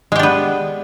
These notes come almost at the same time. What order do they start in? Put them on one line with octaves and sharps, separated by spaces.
G#3 G4 D4 B3